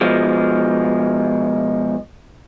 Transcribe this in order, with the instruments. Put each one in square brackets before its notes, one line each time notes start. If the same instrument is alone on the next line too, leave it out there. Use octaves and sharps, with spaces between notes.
[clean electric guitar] B2 F3 G#3